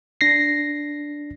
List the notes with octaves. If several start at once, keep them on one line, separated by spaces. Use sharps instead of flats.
D4 A#6 C7